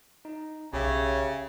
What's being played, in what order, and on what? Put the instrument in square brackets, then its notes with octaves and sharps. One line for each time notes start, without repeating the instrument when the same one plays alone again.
[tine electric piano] D#4
[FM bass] B1 [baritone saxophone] C#3 [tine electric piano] G4 C#5 E5